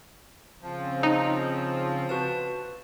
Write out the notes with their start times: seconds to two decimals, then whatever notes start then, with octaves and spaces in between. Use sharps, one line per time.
0.62 C#3 F3 C4
1.03 D#4
2.09 F#4 B4 A5